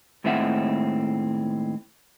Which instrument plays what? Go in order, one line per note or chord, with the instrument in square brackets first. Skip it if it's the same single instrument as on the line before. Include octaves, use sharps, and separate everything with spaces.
[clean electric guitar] D#2 A2 G#3 C4 E5 F#5